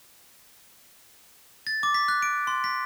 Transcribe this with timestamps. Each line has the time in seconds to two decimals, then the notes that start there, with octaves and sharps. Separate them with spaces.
1.67 A6
1.83 D6
1.94 B6
2.08 F#6
2.22 D7
2.47 C6
2.64 B6